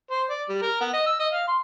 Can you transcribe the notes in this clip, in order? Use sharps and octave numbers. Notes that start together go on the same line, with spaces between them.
C5
D5
G3
A#4
B3
D#5
E6
D#5
F5
C6